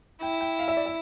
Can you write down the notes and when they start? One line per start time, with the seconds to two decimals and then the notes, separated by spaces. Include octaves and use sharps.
0.22 E4 G5
0.41 G5
0.59 F5
0.68 E5
0.77 D5
0.86 E5